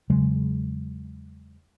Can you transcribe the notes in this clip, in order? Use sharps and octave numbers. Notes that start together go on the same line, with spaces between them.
E2 C#3 F#3 G#3